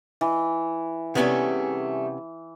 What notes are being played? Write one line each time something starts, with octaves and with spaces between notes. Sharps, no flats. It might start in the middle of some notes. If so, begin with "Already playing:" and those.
E3
C3 G3 A3 B3 C#4 G#4